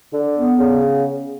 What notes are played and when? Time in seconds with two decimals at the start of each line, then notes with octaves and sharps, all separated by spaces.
0.14 D3
0.37 B3
0.59 C#3